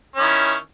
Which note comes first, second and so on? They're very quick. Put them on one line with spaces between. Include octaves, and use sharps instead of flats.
C#4 D#3 E4